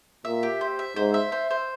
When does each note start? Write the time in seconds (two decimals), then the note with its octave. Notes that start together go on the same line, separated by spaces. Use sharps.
0.25 A#2 E5
0.43 G4
0.61 C5
0.79 E5
0.96 G#2 C5
1.14 E5
1.32 C5
1.51 C5